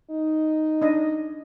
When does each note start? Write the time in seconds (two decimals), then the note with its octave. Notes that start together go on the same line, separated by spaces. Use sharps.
0.11 D#4
0.82 D4 D#5